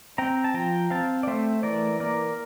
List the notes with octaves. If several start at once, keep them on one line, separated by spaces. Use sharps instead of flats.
C4 G5 A#5
A5
F3 G5 A#5
C4 F5 A5
D5
A3 C5 E5
E3 A#4 D5
A#3 A#4 D5